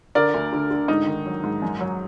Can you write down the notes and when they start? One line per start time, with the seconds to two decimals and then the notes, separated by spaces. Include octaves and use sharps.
0.15 D3 A#4 D5
0.34 D2
0.53 D3
0.71 D3
0.88 G#2 D#4
1.07 D#3
1.26 F#3
1.43 G#2
1.62 F#2
1.81 F#3